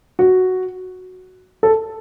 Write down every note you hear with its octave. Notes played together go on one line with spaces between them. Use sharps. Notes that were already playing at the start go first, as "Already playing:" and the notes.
F#4
A4